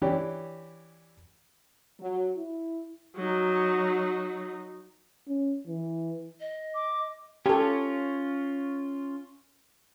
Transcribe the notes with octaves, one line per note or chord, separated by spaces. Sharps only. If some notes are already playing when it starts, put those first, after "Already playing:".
E3 C#4 D4 G4
F#3
E4
F#3 D#4
C#4
E3
D#5
D6
C#4 F4 G4 A4 C#5